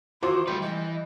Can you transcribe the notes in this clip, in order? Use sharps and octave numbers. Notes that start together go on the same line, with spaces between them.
D#3 E3 F4 F#4 C5 C6 D6
G3 A3 B4 G6
E3 D#5